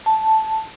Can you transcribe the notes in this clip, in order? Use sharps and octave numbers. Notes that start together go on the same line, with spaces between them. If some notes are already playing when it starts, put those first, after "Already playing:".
A5